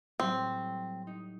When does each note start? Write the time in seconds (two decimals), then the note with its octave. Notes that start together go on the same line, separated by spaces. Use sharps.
0.20 A2 F#3 G3 C4
1.07 D#4